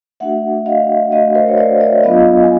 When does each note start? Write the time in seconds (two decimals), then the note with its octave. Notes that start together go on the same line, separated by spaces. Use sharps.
0.20 A3 D4 F#4 E5 F#5
0.66 D#5 F5
1.12 A3 D4 F#4 D#5 F5
1.35 A#4 C5
1.48 C#5
1.57 C5 D5
1.80 D5 E5
2.03 F#3 B3 D4 F4 D#5 F5
2.44 G#5